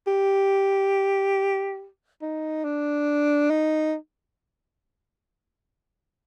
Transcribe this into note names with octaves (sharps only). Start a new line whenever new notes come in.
G4
D#4
D4
D#4